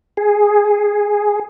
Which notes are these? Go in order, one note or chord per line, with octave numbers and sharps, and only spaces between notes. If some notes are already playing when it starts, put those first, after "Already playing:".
G#4